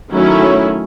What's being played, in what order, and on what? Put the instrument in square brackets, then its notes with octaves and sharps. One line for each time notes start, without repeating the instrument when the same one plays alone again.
[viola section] D#3 F#3 A3 C#4 E4